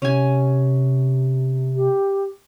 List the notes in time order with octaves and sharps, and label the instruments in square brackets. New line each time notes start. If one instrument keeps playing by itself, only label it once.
[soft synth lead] C3 [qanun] C#4 G#5
[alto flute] G4